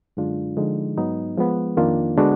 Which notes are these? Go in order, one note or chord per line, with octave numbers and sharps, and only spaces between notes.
F#2 D3 G#3 D4 F4
D3 F3 G#3 D#4
G#2 F#3 B3 D#4
F3 G#3 B3
F2 D#3 A#3 D4 F4
D3 G#3 B3 D4 F#4